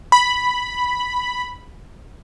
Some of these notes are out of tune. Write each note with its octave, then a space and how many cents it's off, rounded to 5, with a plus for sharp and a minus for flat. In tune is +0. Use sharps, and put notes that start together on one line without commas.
B5 +0